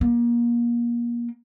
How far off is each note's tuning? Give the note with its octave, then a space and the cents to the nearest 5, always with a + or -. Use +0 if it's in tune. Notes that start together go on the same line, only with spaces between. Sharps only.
A#3 +30